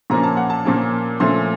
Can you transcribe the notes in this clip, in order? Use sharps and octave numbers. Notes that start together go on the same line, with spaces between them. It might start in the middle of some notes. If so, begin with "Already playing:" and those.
A#2 F3 A#3 C#4 A#5
A5
F#5
A5
A#2 F3 A#3 C#4
A#2 F3 A3 C#4 C6